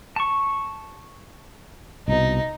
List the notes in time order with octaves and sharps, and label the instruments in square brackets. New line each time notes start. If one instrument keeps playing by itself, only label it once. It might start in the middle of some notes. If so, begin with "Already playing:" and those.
[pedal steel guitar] A5 C#6
[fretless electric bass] C2 B2 [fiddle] D#4